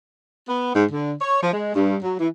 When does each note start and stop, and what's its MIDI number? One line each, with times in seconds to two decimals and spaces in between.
0.47 0.71 59
0.74 0.84 44
0.91 1.12 50
1.21 1.41 73
1.42 1.52 53
1.53 1.73 56
1.75 1.96 43
2.03 2.15 54
2.20 2.28 52